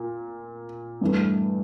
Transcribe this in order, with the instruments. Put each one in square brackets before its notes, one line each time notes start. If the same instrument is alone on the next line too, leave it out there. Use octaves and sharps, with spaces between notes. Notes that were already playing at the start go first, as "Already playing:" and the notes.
Already playing: [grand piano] A#2
G2 E3 A3